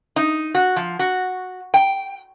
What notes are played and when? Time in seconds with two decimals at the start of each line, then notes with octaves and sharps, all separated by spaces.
0.16 D#4
0.55 F#4
0.76 F3
0.99 F#4
1.74 G5